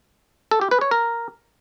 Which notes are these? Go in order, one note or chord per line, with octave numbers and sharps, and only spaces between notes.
A4
G4
B4
C#5
A#4